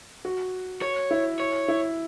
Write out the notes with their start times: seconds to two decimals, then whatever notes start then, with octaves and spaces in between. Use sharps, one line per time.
0.25 F#4
0.82 C#5
1.11 E4
1.40 C#5
1.68 E4